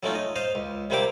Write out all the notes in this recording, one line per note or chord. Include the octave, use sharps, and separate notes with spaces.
F#3 G#3 A3 C#4 D#4 F4
D#5
C5 D#5 F5
C#2
C3 G3 A#3 C4 C5 D6